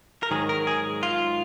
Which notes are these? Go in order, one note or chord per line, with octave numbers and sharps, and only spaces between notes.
A#4
G#2 D#3 F#3 G#4
A#4
G#4
F4